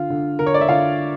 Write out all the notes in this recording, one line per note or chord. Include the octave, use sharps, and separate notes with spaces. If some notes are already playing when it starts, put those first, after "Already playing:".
Already playing: D3 F4
D3
D3 A#4
C#5
D5
E5
D3 F4 F5